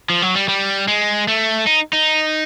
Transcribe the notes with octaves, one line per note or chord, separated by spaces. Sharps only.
F3
F#3
G3
G3
G#3
A3
D#4
D#4